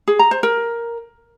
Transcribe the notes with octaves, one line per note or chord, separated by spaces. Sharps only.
G#4
A#5
C5
A#4